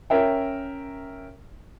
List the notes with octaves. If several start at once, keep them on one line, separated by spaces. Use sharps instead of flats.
C#4 A#4 E5 G5